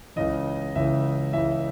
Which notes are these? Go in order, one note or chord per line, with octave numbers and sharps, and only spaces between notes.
C#2 C#3 E3 D#5
C#2 C#3 E3 E5
C#2 C#3 E3 E5